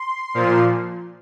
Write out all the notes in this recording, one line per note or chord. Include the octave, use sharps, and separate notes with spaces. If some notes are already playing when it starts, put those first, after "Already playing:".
Already playing: C6
A#2 F3